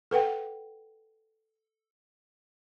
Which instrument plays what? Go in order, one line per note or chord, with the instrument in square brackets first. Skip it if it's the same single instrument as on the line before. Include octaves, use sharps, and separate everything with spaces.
[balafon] A4 B4 F#5 G5